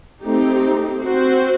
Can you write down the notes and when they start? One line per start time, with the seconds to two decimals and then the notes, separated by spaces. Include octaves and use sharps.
0.23 A3 C4 D#4 G4
1.04 C4 F#4 C5